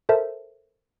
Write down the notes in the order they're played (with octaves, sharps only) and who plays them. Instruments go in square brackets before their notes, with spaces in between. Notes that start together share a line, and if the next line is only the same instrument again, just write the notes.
[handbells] A4 A#4 C5 E5 A5